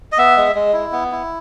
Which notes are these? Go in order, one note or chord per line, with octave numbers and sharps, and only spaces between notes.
D#5
B3 E5
G#3
G#3
E4
B3
E4